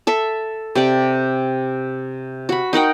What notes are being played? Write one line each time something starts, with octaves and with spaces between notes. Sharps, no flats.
A4 E5
C3 G4 D5
F#4 B5
D#4 A#4 F#5 G5